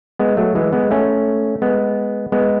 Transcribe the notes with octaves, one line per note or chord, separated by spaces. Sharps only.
G#3 B3
F#3 A3
E3 G#3
G#3 B3
A3 C#4
G#3 B3
G#3 B3